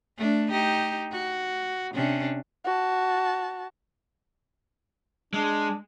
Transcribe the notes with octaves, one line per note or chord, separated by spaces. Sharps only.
A3 D4
D#4 G4
F#4
C3 C#4 D4
F#4 A5
G#3 D4